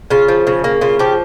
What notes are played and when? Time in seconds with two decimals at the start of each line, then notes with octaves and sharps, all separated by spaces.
0.10 C#3 F4
0.28 F3
0.47 C#3
0.64 A#3
0.81 C#3 F4
0.99 F3 G4